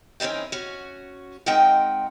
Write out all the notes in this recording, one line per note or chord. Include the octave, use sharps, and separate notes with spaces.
E3 A#3 C4 C#4 D#4
C#4 F#4
G#3 C4 D#4 A#4 F#5 G5